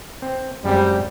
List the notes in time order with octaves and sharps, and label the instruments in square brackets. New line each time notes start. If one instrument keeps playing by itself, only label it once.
[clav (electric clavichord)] C4
[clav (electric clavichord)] F#2 G#3 C4 [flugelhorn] G3